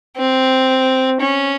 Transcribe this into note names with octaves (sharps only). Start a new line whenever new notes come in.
C4
C#4